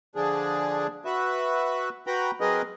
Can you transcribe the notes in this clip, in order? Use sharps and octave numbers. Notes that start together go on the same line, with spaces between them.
D3 F3 D4 G#4
F#4 B4 E5
F#4 B4 G5 A#5 B5
F#3 C4 G#4 A#4 B4 D#5